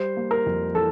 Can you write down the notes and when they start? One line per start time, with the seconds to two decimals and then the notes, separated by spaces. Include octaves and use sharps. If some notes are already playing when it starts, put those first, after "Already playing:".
Already playing: G3 C5
0.17 A#3
0.31 A#4
0.46 F2
0.74 E3 A4